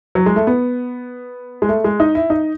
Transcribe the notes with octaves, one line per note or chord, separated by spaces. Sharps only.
F#3
G#3
A3
B3
G#3
A3
G#3
D#4
E4
D#4